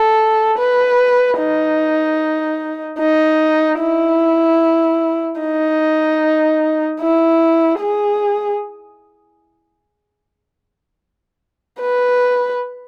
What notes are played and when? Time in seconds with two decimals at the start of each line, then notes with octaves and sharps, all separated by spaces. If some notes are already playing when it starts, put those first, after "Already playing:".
Already playing: A4
0.59 B4
1.39 D#4
2.99 D#4
3.79 E4
5.40 D#4
7.01 E4
7.80 G#4
11.81 B4